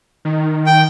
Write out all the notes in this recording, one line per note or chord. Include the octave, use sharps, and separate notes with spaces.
D#3
G5